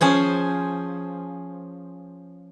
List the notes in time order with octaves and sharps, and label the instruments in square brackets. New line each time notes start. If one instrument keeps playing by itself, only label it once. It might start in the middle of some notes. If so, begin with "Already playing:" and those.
[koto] F3 C#4 G#4 C5